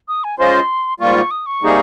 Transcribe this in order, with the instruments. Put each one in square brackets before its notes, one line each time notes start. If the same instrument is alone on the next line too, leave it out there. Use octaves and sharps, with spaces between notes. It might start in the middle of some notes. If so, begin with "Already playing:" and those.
[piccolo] D#6
G#5
[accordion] G#3 C#4 F4 C5 D#5 [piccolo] C6
[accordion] G#2 G3 A#3 F4 [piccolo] C#6
[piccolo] D#6
C#6
[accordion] C3 G3 A#3 D#4 G#4